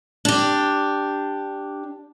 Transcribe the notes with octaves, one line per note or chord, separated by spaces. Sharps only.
D4 G4